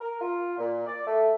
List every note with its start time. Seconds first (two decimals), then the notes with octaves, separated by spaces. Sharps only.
0.01 A#4
0.21 F4
0.58 A#2
0.87 D5
1.06 A3